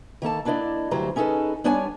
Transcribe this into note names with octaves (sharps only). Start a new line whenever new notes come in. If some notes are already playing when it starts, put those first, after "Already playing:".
D#3 A#3 A4 A5
A#3 D4 E4 D5 D#5
D2 G2 F#3 G4 C5 A#5
C#4 D#4 G#4 A4 B4
G3 B3 D4 C#5 D5 G#5